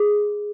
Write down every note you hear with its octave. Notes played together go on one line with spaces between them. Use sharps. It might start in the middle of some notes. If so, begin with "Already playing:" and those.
Already playing: G#4